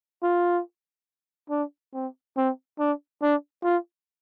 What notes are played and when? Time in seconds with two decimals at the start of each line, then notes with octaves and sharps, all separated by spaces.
0.22 F4
1.50 D4
1.94 C4
2.37 C4
2.79 D4
3.22 D4
3.64 F4